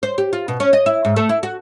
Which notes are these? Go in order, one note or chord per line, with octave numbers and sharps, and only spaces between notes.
C5
G4
F4
B2
C#4
D#5
E4
G#2
A3
E4
F#4